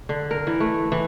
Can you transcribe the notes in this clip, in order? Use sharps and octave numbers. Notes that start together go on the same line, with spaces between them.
D3
A#4
E3
A3
E3